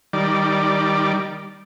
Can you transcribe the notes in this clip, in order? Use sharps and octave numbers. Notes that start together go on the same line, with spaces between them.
D#3 G3 D5